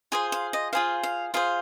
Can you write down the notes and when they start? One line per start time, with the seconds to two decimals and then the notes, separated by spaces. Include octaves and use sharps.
0.12 F4 G#4 C5 G#5
0.32 F5
0.53 D#5
0.73 F4 G#4 C5 F5
1.03 F5
1.34 F4 G#4 C5 F5